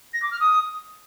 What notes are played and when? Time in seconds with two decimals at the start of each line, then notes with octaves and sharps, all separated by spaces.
0.13 A#6
0.22 D6
0.31 F6
0.40 D#6